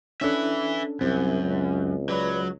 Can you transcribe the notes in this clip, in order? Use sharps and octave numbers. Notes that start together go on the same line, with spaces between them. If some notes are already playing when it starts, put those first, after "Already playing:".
C#4 D4 A4 B4 E5
C2 F#2 C4
C#2
F#3 B4 D5 B5